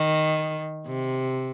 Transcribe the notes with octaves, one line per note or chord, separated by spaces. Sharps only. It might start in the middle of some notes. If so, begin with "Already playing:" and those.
Already playing: D#3
C3